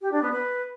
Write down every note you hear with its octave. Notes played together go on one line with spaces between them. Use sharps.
G4
D4
B3
B4